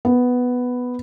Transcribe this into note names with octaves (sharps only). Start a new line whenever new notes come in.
B3